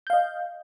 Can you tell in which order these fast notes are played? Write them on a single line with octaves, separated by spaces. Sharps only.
G6 F5 D#5